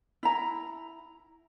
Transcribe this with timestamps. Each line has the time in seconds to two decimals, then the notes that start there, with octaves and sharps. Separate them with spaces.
0.23 E4 A#5